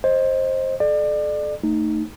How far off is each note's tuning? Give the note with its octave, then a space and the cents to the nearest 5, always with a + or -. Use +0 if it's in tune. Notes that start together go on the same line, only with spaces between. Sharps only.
C5 +15 D#5 +0
A4 -35 D5 +30
A3 +25 D#4 -10